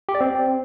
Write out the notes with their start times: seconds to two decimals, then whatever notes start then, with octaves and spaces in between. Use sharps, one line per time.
0.09 G4
0.15 D5
0.21 C4